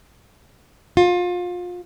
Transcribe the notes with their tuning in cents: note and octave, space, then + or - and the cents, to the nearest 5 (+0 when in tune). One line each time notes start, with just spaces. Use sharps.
F4 +30